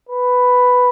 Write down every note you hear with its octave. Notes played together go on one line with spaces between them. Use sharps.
B4